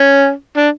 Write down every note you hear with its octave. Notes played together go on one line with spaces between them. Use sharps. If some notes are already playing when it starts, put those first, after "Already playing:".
Already playing: C#4
D4